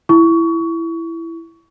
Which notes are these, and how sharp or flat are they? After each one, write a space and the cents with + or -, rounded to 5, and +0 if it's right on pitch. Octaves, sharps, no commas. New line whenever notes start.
E4 +10 C#6 +25